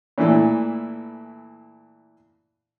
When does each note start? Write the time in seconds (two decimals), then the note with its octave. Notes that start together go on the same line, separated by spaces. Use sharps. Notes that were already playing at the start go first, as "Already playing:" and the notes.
0.18 A#2 E3 A3 E4 A4